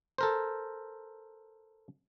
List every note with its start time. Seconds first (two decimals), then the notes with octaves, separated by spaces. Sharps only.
0.18 A4 A#4 C5